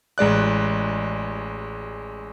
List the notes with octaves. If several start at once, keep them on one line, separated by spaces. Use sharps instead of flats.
A1 G#3 D5 F#6